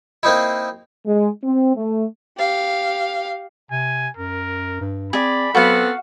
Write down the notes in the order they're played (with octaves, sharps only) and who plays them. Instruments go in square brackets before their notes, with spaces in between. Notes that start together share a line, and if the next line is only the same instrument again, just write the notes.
[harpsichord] A#3 C4 D#4 E4
[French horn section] G#3
C4
A3
[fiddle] G4 F5
[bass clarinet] C3 [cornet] G#5
[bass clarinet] F#2 [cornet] A#4
[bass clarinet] G2
[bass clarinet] C4 [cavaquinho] G#4 D5 [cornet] B5
[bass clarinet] F#3 [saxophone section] B3 C4 A4 [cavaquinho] F#4 F5 F#5